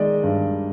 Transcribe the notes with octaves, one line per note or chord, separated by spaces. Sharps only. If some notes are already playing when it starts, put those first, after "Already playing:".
Already playing: D#3 G#3 D5 D#5
G2